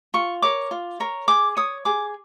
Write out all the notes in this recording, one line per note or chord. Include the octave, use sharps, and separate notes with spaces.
F4 C#6
A#4 C#5 D6
F4
A#4 C#5
G#4 D6
C#5 D#6
G#4 D6